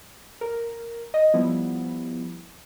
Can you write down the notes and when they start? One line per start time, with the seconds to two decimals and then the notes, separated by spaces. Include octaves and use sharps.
0.41 A#4
1.14 D#5
1.34 F3 G3 B3 E4